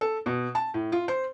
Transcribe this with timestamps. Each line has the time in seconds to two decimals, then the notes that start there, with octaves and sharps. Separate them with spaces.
0.01 A4
0.26 B2
0.55 A5
0.74 A2
0.92 F4
1.08 C5